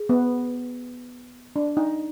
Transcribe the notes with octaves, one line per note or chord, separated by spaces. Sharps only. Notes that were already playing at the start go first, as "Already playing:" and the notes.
Already playing: G#4
B3
D4
D#4